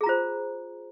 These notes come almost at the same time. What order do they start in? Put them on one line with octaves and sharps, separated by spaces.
G#4 A#5 F4 C5